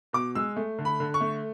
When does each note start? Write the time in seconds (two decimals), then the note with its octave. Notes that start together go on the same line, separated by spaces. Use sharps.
0.13 B2 D6
0.35 G#3 E6
0.56 A3
0.78 D3
0.85 B5
1.00 D3
1.14 C#6
1.21 A3